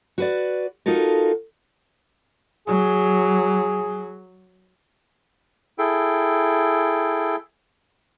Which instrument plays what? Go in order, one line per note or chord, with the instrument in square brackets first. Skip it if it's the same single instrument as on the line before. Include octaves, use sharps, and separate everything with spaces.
[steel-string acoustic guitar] F#4 B4 D5
D#4 F4 F#4 A4 A#4
[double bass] F#3 [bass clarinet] G#4
[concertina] E4 G#4 A4 G5